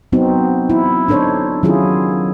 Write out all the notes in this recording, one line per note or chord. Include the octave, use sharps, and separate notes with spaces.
F#3 B3 C4 D#4 F#4
E4
D4 D#4 A4 C5 C#5
D#3 F#3 C#4 E4 F4 G#4